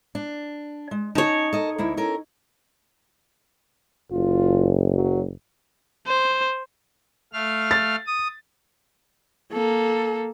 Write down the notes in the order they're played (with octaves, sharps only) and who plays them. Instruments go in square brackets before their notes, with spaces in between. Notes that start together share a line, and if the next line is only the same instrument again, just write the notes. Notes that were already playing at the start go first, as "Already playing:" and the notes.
[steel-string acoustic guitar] D4
G#3
[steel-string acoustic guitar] C#4 A5 [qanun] D#4 C#5
[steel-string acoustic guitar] A4 A#4 D#5
D2 A#3 E4
C#4 A4 A#4
[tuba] F#1 [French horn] F4
[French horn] F#3
[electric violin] C5
[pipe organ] A3 F5 F6
[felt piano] A6
[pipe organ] D#6
[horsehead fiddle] A#3 A4